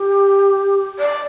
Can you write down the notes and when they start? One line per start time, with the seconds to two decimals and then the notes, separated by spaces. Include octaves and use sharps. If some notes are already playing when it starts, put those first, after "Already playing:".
Already playing: G4
0.99 D5